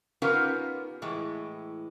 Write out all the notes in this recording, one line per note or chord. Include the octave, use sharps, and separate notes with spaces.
B3 C#4 D#4 F4 G4 A#4
A2 E3 G#3